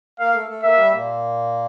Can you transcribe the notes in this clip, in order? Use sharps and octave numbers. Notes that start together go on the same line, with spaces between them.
A#3 A#4 F5
A3 A4
A3 A4
A#3 A#4 E5
G3 G4
A#2 A#3